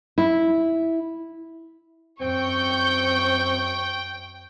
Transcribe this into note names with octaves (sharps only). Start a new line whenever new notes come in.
E4
F#2 C4 G5 C#6 G6